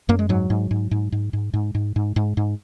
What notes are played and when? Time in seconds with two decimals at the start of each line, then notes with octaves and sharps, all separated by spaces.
0.09 F#2 A#3
0.19 G#3
0.29 G#2 F#3
0.50 G#2
0.71 G#2
0.91 G#2
1.12 G#2
1.33 G#2
1.53 G#2
1.75 G#2
1.96 G#2
2.16 G#2
2.37 G#2